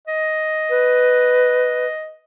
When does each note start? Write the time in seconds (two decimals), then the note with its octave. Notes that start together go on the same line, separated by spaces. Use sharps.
0.07 D#5
0.70 B4